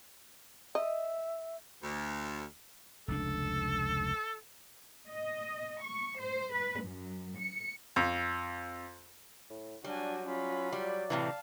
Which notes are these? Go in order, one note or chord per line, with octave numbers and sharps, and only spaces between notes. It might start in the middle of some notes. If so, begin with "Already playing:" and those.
D#5 E5
D2
F1 C#2 D4 A4
D#5
C#6
C5
B4
F#2
C#7
F2
A2
F#3 G3 D4 F#4 G#5
C#4 F4 B5
G3 D5
A2 C3 E3 F5 A5